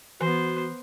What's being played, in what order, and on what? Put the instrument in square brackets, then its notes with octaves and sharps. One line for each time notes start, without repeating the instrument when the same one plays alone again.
[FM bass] E3 [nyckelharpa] B3 C5 [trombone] F#4